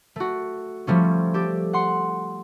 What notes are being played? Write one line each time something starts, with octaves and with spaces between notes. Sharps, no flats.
A3 F#4
F3 G3 A3 C#4
G4 A4 D5
F#5 C6 C#7